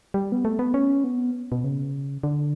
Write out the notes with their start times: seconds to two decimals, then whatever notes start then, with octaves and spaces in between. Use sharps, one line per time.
0.14 G3
0.32 B3
0.45 A3
0.59 B3
0.74 C#4
1.04 B3
1.52 B2
1.64 C#3
2.23 D3